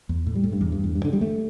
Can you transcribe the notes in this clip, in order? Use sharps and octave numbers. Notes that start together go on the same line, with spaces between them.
E2
A2
G3
A2
G2
E2
G2
E2
G2
D3
G3
A3